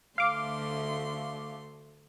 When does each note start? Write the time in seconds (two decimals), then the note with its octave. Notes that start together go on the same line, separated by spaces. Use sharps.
0.18 D2 A3 F5 C6 D6